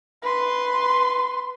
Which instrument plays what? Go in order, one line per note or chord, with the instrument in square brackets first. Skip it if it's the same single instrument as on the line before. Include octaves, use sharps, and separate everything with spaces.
[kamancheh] B4 C6